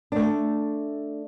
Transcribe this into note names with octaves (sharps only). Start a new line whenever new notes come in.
A3 D4